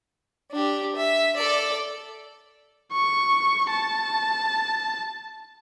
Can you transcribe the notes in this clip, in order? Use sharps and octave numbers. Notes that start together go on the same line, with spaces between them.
D4 G4
E5
A4 D5
C#6
A5